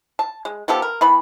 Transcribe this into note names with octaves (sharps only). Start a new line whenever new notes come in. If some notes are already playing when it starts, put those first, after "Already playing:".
A5
G#3
F3 B3 G4 A4
A#4
E3 B3 B5